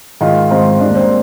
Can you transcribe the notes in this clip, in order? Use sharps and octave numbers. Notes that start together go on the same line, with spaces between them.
G#2 D#3 G#3 F4
G#2 D#3 G#3 C4
G#2 G3 D4
A#3
C4